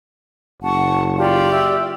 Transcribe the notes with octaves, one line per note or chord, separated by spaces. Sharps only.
F#1 F#5 A5 C#6
F4 G4 D5
E5